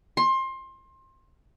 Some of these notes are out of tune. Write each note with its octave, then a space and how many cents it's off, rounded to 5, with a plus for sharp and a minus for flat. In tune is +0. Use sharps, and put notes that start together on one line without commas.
C6 +25